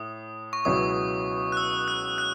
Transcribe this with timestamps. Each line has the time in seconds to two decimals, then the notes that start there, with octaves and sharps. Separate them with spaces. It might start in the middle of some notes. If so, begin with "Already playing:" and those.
Already playing: A2 D#6
0.53 C#6
0.65 C#2 B2 F#3 C#4 E4 D#6
1.52 F#6
1.57 E6
1.88 F#6
2.18 F#6